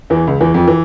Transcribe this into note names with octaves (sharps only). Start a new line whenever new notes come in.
E2 E3
C#2 C#3
E2 E3
F2 F3
E3